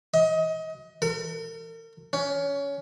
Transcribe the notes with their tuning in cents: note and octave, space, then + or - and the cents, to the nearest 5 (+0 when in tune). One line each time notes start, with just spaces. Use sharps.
D#5 +25
A#4 -40
C#4 +20